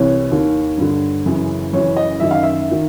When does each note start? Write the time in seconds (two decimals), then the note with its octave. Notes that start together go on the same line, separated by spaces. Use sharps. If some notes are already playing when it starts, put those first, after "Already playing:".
Already playing: C2 C3 E3 C#5
0.31 D#2 D#3
0.78 G2 D3
1.26 F#2 C#3 E3
1.73 F#2 C#3 E3 C#5
1.97 D#5
2.20 F#2 D#3 E5
2.31 F5
2.43 E5
2.71 D#3